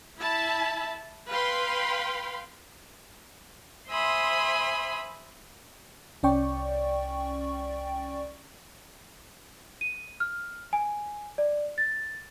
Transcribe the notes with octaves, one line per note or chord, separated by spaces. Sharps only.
E4 E5 A5 B5
B4 F5 G5 B5 C6
C5 E5 G#5 B5 C6 D#6
C2 C#4 D5 G5 C#6
D#7
F6
G#5
D5
A6